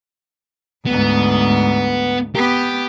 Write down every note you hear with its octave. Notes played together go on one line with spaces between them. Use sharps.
D2 G#2 B3
B3 G4